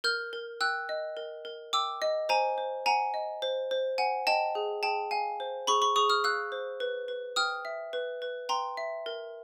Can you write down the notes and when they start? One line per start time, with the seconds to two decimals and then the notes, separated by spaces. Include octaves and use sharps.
0.04 A#4 F6 G6
0.33 A#4
0.61 G5 E6 F#6
0.89 D#5
1.17 A#4
1.45 A#4
1.73 G5 D6 E6
2.02 D#5
2.29 C5 G#5 A#5
2.58 C5
2.86 F#5 G#5 A#5
3.14 D#5
3.42 C5
3.71 C5
3.98 F#5 G#5
4.27 D#5 G5 A5
4.55 G#4
4.83 G#4 G5 A5
5.11 F5 G#5
5.40 C5
5.67 G#4 B5 C#6
5.82 B5 C#6
5.96 G#4 C#6 D#6
6.09 D#6 F6
6.24 F5 E6 F#6
6.52 C5
6.80 B4
7.08 B4
7.36 G5 D#6 F6
7.65 E5
7.93 B4
8.22 B4
8.49 G5 A#5 C6
8.77 E5
9.06 A#4